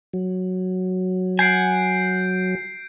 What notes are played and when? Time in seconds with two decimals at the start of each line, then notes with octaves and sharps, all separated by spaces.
0.13 F#3
1.39 F#5 G#5 G6 C7 D7